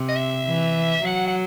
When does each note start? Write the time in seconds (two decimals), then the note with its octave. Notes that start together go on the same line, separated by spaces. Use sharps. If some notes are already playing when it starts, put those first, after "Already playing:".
Already playing: C3
0.08 D#5
0.16 E5
0.46 E3
1.05 F#3 F#5
1.27 F#5